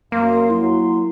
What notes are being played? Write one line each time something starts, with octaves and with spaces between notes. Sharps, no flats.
F#2 A#3 F5 C6 D#6
F#3 E4 C6